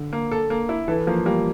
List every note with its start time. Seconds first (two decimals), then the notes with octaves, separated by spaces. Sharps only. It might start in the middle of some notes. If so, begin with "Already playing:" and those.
Already playing: D3
0.13 A#3
0.32 A4
0.50 A#3
0.69 E4
0.88 E3 A4
1.07 F3 A#3
1.25 G3 A#3